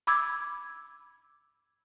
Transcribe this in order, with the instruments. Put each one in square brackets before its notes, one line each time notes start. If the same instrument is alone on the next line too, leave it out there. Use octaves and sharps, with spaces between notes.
[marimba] B5 D6 E6 G#6